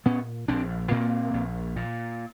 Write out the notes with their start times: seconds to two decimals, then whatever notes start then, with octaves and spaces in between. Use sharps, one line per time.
0.06 A#2 B3 C#4
0.48 A#1 C4 D4
0.91 A#2 A#3 C4
1.33 A#1
1.76 A#2